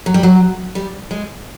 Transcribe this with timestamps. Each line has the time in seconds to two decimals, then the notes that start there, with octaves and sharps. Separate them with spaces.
0.06 F#3
0.14 G3
0.23 F#3
0.75 G3
1.11 G#3